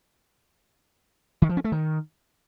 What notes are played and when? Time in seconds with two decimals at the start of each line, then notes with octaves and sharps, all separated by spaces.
1.42 D#3
1.49 F3
1.57 C#4
1.64 A3
1.72 D#3